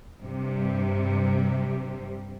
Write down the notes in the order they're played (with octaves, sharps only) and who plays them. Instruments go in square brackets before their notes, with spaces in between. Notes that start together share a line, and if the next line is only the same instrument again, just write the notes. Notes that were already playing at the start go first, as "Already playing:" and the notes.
[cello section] G2 C3 G3